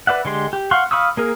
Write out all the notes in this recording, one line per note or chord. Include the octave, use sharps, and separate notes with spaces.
B4 D5 E5 F#5
D3 G#3 G4 C6
G4
F5 F#5 C6 C#6
F5 B5 C#6 D#6 E6
A#3 G#4 A#4